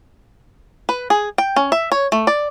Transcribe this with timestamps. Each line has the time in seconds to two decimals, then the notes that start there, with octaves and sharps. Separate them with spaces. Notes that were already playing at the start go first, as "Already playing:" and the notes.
0.89 B4
1.10 G#4
1.38 G5
1.56 C#4
1.72 E5
1.92 C#5
2.12 A3
2.27 D5